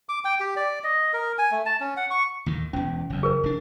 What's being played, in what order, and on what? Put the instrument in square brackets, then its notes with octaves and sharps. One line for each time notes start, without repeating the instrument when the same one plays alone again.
[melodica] D6
G5
G4
D5
D#5
A#4
G#5
A3
A5
C#4
F#5
C#6
[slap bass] D#2 A2 D#3
[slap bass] E1 E2 [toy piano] C#4
[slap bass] F#1 E2
[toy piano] G#4 A#4 B4
[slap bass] F1 D4